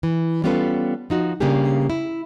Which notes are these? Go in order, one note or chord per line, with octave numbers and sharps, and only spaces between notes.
E3
G3 B3 C#4 F4 A4 B4
F3 D#4 F#4
C#3 G3 A#3 D4 G4 G#4
E4